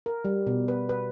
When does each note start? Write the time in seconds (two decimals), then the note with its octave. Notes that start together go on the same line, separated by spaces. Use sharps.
0.06 A#4
0.25 G3
0.47 B2
0.68 B4
0.89 B4